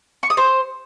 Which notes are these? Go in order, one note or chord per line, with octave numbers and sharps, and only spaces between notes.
C#6
D#6
C5